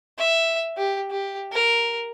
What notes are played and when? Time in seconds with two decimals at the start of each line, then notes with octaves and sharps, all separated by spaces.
0.18 E5
0.77 G4
1.11 G4
1.52 A#4